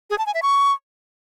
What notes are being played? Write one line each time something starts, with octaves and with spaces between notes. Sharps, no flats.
G#4
A5
G#5
E5
C#6